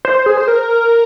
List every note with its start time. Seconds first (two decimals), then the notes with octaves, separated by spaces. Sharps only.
0.05 C5
0.26 G#4
0.37 C5
0.48 A#4